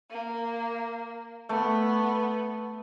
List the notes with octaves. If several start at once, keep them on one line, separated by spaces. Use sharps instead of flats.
A#3
A3 B3